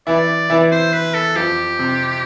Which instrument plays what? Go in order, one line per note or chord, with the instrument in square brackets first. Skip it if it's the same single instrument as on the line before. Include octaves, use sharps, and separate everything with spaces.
[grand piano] E3 E4 [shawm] D5
[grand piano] E3 E4
[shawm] C5
B4
A4
[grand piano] F2 F3 [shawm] G4
[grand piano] C3